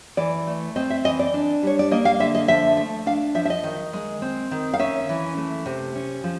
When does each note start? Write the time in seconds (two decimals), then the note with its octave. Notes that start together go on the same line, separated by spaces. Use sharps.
0.17 E3 D5
0.47 A3
0.76 C4 D#5
0.90 E5
1.04 E3 D#5
1.19 D5
1.34 D4
1.63 G3 C#5
1.79 D5
1.91 A#3 D#5
2.05 F5
2.20 D3 E5
2.35 D#5
2.48 F3 E5
2.77 A3
3.06 D4 F5
3.35 F3 E5
3.45 E5
3.50 D#5
3.64 D#3
3.93 G#3
4.22 C4
4.51 D#3
4.74 F5
4.79 C#4 E5
5.09 E3
5.37 A3
5.66 C3
5.96 C#4
6.24 F3